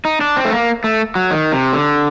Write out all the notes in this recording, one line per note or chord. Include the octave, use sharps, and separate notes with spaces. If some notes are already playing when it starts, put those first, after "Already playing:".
D#4
D4
C4
A3
A#3
A3
F#3
D#3
C3
D3